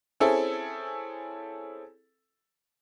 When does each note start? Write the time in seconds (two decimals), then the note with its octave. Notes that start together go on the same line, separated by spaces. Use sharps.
0.20 C4 C#4 E4 G#4 A4